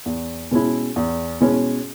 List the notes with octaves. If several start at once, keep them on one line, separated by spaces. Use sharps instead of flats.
E2
B2 G#3 C#4 E4
E2
B2 G#3 C#4 E4